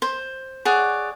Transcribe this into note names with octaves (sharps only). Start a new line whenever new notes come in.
C5
G#4 C#5 D5 F#5